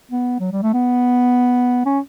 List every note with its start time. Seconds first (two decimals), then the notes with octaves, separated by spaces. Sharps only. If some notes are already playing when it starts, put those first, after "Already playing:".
0.11 B3
0.40 F#3
0.52 G3
0.62 A3
0.74 B3
1.86 C#4